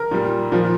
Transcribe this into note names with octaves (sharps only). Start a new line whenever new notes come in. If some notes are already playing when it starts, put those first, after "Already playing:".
Already playing: A#4
A#2 G3
A#2 F3